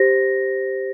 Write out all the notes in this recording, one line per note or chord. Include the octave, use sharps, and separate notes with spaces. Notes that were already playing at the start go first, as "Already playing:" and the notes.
Already playing: G4 C5 A#6